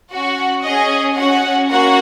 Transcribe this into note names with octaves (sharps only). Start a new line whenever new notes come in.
C#4 F#4 F#5
C#4 G#4 D#5
C#4 F#4 F#5
A#3 C#4 F#4 F#5